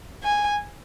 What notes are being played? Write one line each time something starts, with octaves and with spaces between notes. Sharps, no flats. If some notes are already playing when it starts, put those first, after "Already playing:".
G#5